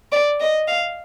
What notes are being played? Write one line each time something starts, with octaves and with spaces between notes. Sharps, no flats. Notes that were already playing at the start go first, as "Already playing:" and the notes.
D5
D#5
F5